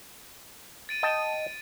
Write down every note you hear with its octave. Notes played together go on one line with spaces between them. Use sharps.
A6 D7 D#7
D#5 G5 A5